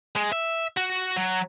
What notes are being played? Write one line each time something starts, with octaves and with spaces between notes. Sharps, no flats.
G#3
E5
F#4
F#3